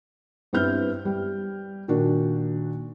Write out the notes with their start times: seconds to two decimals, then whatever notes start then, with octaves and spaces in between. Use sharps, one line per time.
0.53 G2 B3 C4 E4 F6 G6
1.05 G3
1.88 A#2 D#3 D4 F#4